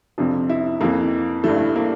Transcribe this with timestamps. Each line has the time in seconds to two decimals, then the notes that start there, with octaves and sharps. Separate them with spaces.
0.18 F2 C3 F3 D4
0.50 E4
0.81 F2 E3 A#3
1.44 G2 E3 A3
1.76 A#3